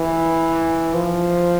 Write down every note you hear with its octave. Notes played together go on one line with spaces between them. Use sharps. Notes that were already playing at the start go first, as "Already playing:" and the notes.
Already playing: E3
F3